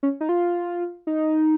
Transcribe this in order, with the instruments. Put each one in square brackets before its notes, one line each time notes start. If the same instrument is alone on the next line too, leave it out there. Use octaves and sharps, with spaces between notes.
[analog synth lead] C#4
D#4
F4
D#4